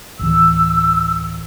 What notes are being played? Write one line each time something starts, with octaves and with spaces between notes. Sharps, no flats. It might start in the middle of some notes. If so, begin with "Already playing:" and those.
A1 D2 E3 E6